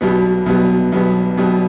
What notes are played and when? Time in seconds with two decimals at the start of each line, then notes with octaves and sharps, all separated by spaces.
0.01 B1 B2 G3 B3
0.46 B1 B2 G3 B3
0.92 B1 B2 G3 B3
1.37 B1 B2 G3 B3